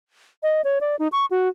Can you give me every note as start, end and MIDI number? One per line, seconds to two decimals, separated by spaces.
0.43 0.61 75
0.64 0.79 73
0.81 0.96 74
0.99 1.08 63
1.12 1.26 85
1.31 1.48 66